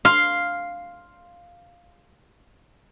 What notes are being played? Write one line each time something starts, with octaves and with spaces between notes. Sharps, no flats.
F5 C6